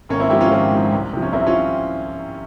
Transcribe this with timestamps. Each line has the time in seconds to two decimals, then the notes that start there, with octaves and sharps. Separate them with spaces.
0.09 G#1 A#3 C#4
0.20 C4 E4
0.30 G#2 F3 E4 G4
0.41 C#4 F4
0.51 G#1 C4
0.71 G#2 F3
0.92 C2
1.13 C3 F3
1.22 C#4
1.32 C2 C4 E4
1.46 C#4 F4